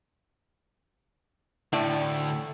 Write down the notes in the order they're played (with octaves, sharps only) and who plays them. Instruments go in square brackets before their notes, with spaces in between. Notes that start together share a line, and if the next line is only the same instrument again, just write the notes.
[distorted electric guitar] D2 D3 [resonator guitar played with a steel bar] A2 [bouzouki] D5 G5 A5